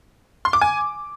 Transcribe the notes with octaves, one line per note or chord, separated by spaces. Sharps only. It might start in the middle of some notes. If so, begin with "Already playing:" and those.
C6
D6
G#5